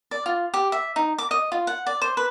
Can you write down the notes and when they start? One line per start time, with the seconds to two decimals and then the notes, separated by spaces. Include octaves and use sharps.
0.11 D5
0.26 F4
0.54 G4
0.72 E5
0.96 D#4
1.18 D6
1.31 D#5
1.52 F4
1.67 F#5
1.87 D5
2.02 C5
2.17 B4